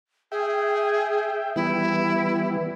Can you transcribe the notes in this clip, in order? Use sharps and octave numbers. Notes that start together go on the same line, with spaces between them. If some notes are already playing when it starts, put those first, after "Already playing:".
G#4 E5 G5
E3 G3 B3 E4